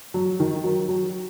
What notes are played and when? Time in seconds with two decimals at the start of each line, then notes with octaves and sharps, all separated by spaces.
0.14 F#3
0.40 D#3
0.64 F#3
0.88 F#3